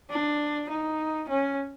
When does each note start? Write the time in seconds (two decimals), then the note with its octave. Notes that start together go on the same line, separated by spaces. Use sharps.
0.10 D4
0.70 D#4
1.29 C#4